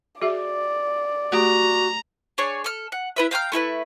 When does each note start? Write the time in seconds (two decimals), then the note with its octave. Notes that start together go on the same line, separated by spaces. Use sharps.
0.22 F#4 G#4 D5 E5
1.32 A3 F#4 G4 A#5
2.38 D4 G#4 C#5 G#5
2.64 A4 F6
2.92 F#5
3.16 E4 B4 E5
3.31 F5 G5 A#5 F6
3.52 A3 E4 A4 B4